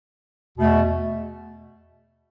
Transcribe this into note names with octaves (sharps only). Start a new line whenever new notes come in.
E2 B2 A3